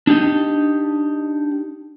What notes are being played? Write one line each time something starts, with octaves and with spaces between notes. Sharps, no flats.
D4 D#4 G4 D#5